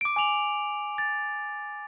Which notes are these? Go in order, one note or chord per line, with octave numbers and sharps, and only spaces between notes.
D6 D7
G#5 D6 F7 F#7
A6